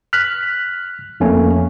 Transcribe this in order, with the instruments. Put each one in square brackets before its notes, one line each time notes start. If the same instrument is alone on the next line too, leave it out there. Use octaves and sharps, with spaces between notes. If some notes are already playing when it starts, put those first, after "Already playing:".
[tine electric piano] F6 F#6 B6
F2 A3 A#3 C#4